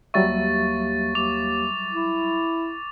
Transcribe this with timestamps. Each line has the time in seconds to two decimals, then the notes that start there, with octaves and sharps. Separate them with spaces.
0.14 D#2 F#3 G3 E5 C#6 A6
1.15 D#2 D6 F7
1.92 E4